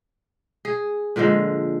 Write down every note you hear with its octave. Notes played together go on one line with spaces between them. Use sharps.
G#4
A#2 D3 F3 G#3